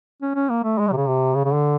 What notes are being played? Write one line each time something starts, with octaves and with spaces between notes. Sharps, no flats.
C#4
C#4
A#3
A3
G#3
G3
C3
C#3
C3
C#3
C#3
D3